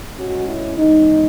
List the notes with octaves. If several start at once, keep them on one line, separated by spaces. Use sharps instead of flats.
A2 G#3 C#4 F#4
E4
E2 C#3 G#3 D#4